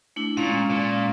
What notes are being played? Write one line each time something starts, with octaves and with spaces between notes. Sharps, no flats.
A3 D4 E4
A#2 G#3 C#4 F5
A#2